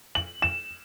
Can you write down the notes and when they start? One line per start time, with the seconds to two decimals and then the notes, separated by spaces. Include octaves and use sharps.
0.15 F#7
0.42 E7